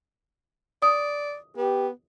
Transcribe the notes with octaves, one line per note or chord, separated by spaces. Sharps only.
D5 D#6
B3 G4